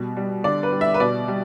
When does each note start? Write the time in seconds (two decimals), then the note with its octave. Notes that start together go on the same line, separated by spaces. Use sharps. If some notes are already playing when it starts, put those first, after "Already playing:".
Already playing: B2 G3
0.17 G3
0.44 D3 D5
0.63 B4
0.72 G3
0.81 E5
0.94 B4
1.00 B2 D5
1.28 G3